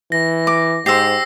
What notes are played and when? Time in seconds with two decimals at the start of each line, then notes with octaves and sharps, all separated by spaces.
0.12 E3 A#6
0.47 D6
0.86 G#2 G4 C5 E6 A#6 C7